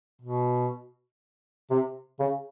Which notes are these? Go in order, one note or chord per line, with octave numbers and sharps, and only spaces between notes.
B2
C3
C#3